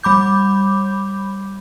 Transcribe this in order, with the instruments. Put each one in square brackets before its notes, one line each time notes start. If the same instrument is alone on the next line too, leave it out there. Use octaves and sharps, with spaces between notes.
[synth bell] G3 B5 D6 G6